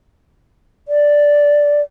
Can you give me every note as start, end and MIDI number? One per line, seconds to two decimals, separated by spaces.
0.88 1.82 74